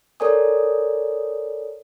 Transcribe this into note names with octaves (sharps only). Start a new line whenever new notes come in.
A4 A#4 C#5 D5 G#5 D#6